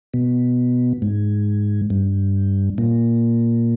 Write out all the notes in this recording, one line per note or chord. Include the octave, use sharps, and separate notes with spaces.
B2
G#2
G2
A#2